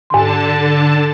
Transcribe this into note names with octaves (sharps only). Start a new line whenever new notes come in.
G#2 D3 A5 C6